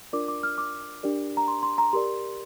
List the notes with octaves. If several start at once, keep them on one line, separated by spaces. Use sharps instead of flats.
D4 F4 A#4 D5 D6
D6
F6
D6
D4 G4 A#4 D5
A#5
C6
C6
A#5
G4 A#4 D5 C6